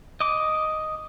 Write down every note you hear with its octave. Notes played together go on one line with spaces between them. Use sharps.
D#5 D6